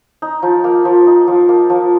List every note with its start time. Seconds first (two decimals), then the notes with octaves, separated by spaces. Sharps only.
0.22 D#4
0.43 F3
0.64 A#3
0.85 F3
1.07 D#4
1.27 F3
1.49 A#3
1.70 F3